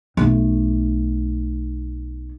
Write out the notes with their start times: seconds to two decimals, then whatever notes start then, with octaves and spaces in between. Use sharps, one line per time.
0.17 B1 A3